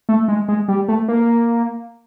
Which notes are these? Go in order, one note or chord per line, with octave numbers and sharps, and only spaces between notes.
A3
G#3
G#3
G3
A3
A#3